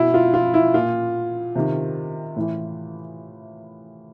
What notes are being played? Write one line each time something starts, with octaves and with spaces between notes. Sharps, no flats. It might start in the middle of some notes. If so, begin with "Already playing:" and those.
Already playing: B2 E4
F4
F4
E4
A#2 F4
C3 D#3
A2 E3